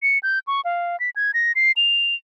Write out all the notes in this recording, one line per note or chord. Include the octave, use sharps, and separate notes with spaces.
C#7
G6
C#6
F5
B6
G#6
A#6
C7
F7